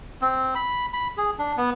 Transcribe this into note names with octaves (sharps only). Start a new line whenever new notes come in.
C4
B5
B5
G#4
D4
B3